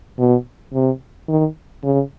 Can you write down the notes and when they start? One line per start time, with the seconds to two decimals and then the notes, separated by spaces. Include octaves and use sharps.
0.19 B2
0.73 C3
1.29 D#3
1.83 C#3